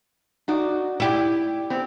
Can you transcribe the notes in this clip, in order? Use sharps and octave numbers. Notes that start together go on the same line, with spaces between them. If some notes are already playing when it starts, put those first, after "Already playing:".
D#4 F#4 D5
E4 G4 D5
B3 C4